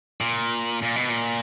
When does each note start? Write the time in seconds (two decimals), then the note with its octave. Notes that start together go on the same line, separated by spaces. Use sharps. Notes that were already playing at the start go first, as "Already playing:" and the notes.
0.21 A#2
0.82 A#2
0.96 B2
1.09 A#2